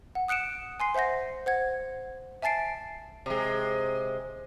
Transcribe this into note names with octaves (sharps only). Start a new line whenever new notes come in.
F#5
D#6 F#6 C#7 D7 E7
G#5 C6 C7
C5 E5 F#5 G6 A#6
C5 F#5 G#6
E5 G#5 A5 A6 C7 D7
C3 G#3